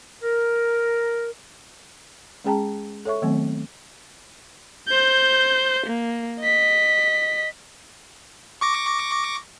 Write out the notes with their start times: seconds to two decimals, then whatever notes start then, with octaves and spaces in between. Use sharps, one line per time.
0.23 A#4
2.44 G#3 C#4 G#4 G5 A5 A#5
3.05 A4 C#5 E5 C#6
3.22 D#3 F#3 A3 B3 C4
4.88 C5 G6
5.86 A#3
6.40 D#5 B6
8.61 C#6 D6 A#6